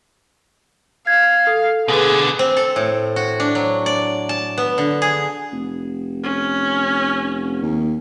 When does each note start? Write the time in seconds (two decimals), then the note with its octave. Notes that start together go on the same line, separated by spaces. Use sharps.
1.07 F5 G#6
1.47 A4
1.88 B2 D3 G#4 B4
2.39 C4
2.57 A4
2.76 A2
3.16 F#4
3.40 D4
3.55 F#3
3.86 D5
4.29 A5
4.58 B3
4.78 D3
5.02 G#4
5.52 F1
6.23 C#4
7.62 D#2